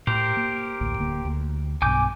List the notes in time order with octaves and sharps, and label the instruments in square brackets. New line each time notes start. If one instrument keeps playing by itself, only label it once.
[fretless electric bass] A2 [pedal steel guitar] G4 A#4 C5
[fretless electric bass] A#3
A1 D2 A2
D1 D3 A#3
D2
[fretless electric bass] B1 G2 B2 [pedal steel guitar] G#5 D6 G6